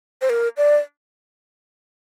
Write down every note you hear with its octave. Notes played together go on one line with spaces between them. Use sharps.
C5
A#4
D5